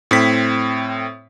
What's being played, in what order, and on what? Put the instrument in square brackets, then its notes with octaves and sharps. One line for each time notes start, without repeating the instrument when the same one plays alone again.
[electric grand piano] A2 C4 B6